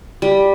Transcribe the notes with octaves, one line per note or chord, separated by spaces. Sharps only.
G3